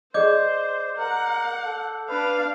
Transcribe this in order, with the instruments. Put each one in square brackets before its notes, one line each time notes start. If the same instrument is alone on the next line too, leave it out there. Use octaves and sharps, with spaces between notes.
[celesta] G#4 D5 D#5 [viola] C5 [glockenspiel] D6 G6
[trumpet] A#4 [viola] F#5
[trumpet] A4
[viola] D4 F5 [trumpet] B4